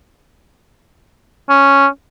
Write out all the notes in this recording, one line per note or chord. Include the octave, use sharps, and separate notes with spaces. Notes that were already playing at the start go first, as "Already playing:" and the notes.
C#4